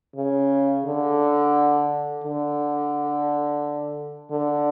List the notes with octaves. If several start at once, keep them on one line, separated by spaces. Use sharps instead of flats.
C#3
D3
D3
D3